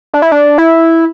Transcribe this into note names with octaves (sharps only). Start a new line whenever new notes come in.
D4
E4
D4
E4